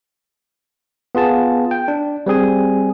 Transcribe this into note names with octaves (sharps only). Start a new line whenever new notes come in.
B3 F4 G#4 A5
G5
D4
G3 C4 G#4 G#5